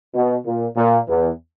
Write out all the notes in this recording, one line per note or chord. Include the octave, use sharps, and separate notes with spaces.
B2
A#2
A#2
E2 E3